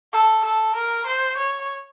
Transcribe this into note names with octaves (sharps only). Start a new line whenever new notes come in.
A4
A4
A#4
C5
C#5